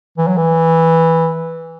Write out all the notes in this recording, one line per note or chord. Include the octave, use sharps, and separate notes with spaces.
E3
F#3
E3